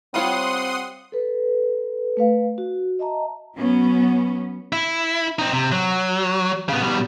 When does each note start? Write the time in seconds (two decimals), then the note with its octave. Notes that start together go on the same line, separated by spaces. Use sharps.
0.14 G3 C4 F4 C#5 F#5 C6 D#6
1.12 A4 B4
2.17 A3 B4 F5
2.58 F#4
2.99 D#5 E5 A5 A#5
3.57 F#3 B3 C#4
4.73 E4
5.39 C4 D#4
5.53 C3
5.72 F#3
6.69 C#3 B3
6.82 B2 G3